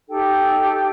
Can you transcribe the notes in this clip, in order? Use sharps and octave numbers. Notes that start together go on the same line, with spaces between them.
D#4 G4 A4 G5